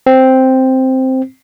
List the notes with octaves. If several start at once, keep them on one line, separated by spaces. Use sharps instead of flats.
C4